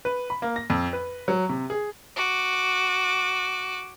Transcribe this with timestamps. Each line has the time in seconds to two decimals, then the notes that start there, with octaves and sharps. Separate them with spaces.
0.05 B4
0.30 B5
0.42 A#3
0.56 A#6
0.70 F2
0.93 B4
1.28 F#3
1.49 C3
1.70 G#4
2.16 F#4 D6